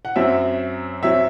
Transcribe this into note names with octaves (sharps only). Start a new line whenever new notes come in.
F#5
F#2 F#3 C4 E5
F#3 C4 E5